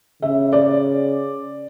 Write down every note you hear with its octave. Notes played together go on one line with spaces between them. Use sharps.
C#3 E5
D5